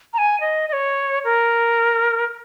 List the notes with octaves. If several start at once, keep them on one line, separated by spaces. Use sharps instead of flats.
A#5
G#5
D#5
D#5
C#5
A#4